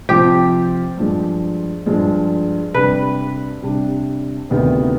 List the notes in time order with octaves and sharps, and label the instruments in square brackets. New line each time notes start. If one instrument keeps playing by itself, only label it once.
[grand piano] C3 F3 C4 F4 C5 [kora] G4
[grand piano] G2 F3 G#3
G2 F3 G#3
[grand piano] C3 G3 D4 [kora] B4
[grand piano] C3 G3 D4
D2 C3 D#3 B3